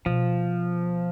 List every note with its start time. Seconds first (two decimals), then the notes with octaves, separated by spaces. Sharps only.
0.06 B2 F3